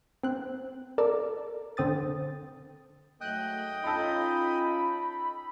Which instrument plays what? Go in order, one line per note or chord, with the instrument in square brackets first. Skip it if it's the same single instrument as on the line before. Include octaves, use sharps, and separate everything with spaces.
[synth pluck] C4 F#6
A4 A#4 D5
D3 C4 D#6 A6
[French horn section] G#2 F#3 A3 [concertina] D#5 G5 D#6 [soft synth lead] F#6
[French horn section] C#4 F4 [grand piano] D#4 A4 [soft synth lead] B5